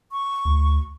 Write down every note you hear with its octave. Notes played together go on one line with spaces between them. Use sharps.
C#6
D2